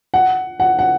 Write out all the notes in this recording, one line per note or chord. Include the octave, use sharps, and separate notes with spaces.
F#5
F#5
F#5